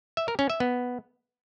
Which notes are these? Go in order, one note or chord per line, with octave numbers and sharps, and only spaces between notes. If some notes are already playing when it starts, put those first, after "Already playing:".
E5
A#4
C#4
E5
B3